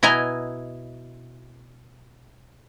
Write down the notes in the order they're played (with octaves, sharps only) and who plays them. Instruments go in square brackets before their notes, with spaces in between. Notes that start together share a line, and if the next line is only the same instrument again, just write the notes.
[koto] B2 E4 D#5 G#5 A#5